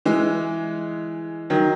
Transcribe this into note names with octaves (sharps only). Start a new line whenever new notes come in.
E3 G#3
D#3 F#3